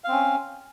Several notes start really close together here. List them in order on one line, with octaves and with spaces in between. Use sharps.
F5 C4 C#4